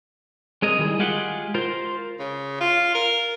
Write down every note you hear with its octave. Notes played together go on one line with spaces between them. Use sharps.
G#3 C4 G#4 A#4 D#5
D#3 G3 E4 G#4
G#3 F4 G4 G#4 F#5
F4 A#4 C5
C#3
F4
A#4